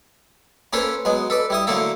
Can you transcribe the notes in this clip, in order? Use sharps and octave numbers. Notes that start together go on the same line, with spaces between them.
A#3 C#4 F4 A4 B4 C5
F#3 G#3 B3
A4 B4 D5
G3 E4 D#6
D3 F#3 A3 A#3 E4 A4